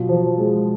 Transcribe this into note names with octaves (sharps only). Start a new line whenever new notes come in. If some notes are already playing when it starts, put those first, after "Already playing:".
Already playing: B2 F#3 F4
F3
G#3